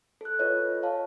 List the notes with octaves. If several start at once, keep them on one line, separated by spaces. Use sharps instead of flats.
A4 F#6
F4 A4 B4 C#5 D#5
C#5 F5 A5